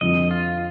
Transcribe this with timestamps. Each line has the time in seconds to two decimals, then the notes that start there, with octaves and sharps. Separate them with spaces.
0.01 F2 D3 F3 C4 D#5
0.31 F4